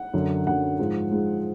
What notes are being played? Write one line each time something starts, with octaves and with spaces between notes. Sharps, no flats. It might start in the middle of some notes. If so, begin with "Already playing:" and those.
Already playing: F#5
F#2 D3 F#3
F#2 D3 F#3 F#5
G#2 F3 G#3
G#2 F3 G#3